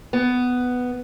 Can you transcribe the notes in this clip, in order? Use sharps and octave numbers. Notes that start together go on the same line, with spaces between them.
B3